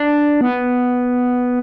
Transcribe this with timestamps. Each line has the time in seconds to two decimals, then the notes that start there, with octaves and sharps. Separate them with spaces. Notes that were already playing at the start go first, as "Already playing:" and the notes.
Already playing: D4
0.41 B3